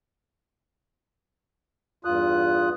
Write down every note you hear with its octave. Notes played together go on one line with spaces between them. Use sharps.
E2 G2 F4 D#6 F#6